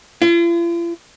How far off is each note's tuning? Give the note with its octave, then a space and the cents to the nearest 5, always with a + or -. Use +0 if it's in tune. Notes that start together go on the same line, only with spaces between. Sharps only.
F4 -45